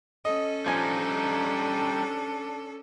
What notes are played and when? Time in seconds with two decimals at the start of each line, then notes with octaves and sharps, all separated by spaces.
0.25 C#4 A4 D#5
0.66 F3 G3 D4 D#4 G#5